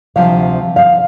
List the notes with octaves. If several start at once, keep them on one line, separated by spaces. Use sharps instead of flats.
D2 C3 F3 F5
F5